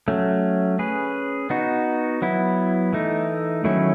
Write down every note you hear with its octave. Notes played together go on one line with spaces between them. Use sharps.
F#3 A3 C#4
C#4 G#4 B4
B3 D#4 F#4
F#3 B3 E4
E3 A3 D#4
D#3 F#3 A3 C#4 E4